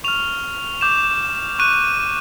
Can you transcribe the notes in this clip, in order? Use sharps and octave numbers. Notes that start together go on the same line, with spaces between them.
C#6 F6 F7
D6 G6 E7
C#6 F#6 D#7